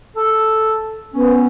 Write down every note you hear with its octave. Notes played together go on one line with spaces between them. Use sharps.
A4
B3 C#4